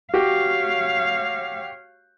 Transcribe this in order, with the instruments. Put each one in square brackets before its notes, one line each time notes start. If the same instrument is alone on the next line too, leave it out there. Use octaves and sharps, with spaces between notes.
[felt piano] F#4 G4 [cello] C#5 F5